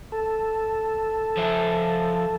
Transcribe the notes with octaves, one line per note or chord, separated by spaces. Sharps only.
A4
F3 E5